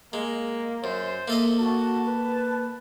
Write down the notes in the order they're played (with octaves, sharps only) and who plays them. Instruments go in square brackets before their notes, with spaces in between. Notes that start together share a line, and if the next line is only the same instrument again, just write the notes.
[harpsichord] G#3 [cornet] A#3
[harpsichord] F#2 [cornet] C5
[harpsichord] A#3 A4 D#5 [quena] E5
[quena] F#4 [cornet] A5
[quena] B4